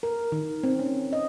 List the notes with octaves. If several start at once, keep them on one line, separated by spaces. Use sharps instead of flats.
A#4
D#3
C4
C#4
D#5